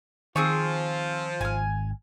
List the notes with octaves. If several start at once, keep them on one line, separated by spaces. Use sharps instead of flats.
D#3 F3 C4 F4 G#4 C#6
G#1 G#5 F6